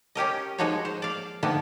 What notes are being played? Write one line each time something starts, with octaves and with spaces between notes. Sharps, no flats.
C#4 G4 A#4 D#5
F3 G#3 A#3 D#4 F#4 C#5
C5
D5 F5
D3 D#3 F3 A#3 B3